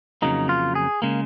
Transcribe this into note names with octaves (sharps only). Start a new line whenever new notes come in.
F2 C#3 F#3 A#3 D#4
F4
G#4
C#3 G#3 A#3